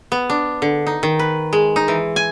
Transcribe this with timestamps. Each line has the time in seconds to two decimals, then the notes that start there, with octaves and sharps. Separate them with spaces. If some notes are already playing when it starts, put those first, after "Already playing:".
0.12 B3
0.30 D4
0.62 D3
0.87 D#4
1.03 D#3
1.19 B4
1.53 G#3
1.76 D#4
1.88 E3
2.16 G#5